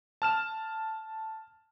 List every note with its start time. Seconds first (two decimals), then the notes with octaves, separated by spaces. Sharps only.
0.22 A5 F6 E7